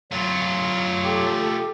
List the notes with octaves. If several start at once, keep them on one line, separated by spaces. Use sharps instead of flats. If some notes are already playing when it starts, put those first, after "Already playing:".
F#3 A3 F4
G4 A4